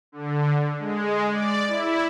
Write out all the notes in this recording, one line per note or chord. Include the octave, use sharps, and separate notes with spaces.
D3
G#3
D5
E4